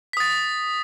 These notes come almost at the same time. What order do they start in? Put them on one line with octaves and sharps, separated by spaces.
B6 D#6 A6